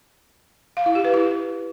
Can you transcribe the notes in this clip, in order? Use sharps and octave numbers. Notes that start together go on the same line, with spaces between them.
F5
E4
G4
B4
E4